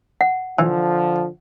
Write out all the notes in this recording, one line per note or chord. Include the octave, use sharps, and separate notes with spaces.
F#5
D3 E3 F3